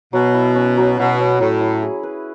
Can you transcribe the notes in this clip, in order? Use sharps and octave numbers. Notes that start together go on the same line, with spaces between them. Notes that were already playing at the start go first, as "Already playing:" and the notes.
B2 F#3
E4
C#4
F#3
B2 E4
C#4
A2 F#3
E4
G#4
B4